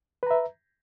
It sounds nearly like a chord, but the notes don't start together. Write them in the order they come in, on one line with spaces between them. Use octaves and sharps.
B4 A#5 E5